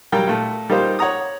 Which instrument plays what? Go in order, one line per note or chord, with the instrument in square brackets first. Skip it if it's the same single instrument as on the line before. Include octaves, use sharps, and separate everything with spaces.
[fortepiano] F#3 G3 A#4 F5 G5
A#2 A3
G3 A#3 D#4 F4 G4 C5
C#5 F#5 A#5 D#6